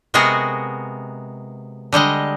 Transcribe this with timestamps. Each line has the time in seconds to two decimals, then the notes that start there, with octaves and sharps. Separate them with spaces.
0.14 C3 G#3 B3 F#4 G#4 A#4
1.92 D3 G3 G#3 D#5